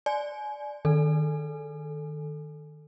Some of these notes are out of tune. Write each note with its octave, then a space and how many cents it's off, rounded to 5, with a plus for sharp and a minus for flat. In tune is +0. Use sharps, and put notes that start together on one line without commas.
D5 +0 G#5 +30
D#3 -25 A4 +0